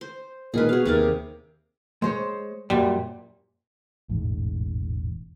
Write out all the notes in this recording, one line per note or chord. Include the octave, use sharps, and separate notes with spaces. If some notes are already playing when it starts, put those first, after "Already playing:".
C5
A#2 D#3 G#3 G#4 A#4 B4
B2 F#4 G#4 F5
D#2 C3 A#4 D5 F5 G#6
G#3 C5 C#5
F#2 A#2 G3
E1 A1 G#2